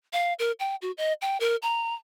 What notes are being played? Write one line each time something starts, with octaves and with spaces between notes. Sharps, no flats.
F5
A#4
G5
F#4
D#5
G5
A#4
A#5